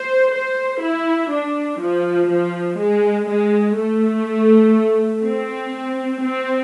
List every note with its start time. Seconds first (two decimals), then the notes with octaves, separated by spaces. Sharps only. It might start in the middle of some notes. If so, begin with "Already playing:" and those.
Already playing: C5
0.33 C5
0.82 E4
1.31 D4
1.81 F3
2.30 F3
2.79 G#3
3.29 G#3
3.77 A3
5.25 C4
6.23 C4